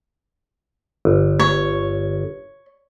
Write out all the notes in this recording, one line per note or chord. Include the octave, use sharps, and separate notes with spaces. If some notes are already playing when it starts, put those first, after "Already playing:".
G1
C#5